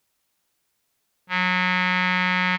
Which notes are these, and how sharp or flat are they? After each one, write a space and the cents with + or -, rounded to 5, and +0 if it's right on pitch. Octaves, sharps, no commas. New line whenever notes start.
F#3 -25